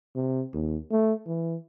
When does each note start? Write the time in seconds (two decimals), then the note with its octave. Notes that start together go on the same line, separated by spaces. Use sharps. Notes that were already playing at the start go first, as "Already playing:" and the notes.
0.16 C3
0.53 D#2
0.91 A3
1.26 E3